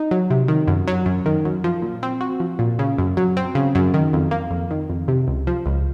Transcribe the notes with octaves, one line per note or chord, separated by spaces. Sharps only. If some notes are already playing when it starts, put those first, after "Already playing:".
Already playing: D#4
F#3
C3
D#3
F#2
F#3
F#2
D#3
F#2
F3
A#2
C4
F#4
F3
A#2
C#3
F#2
F#3
C4
C#3
F#2
D#3
F2
A#3
F2
D#3
F2
C3
C#2
F3
C#2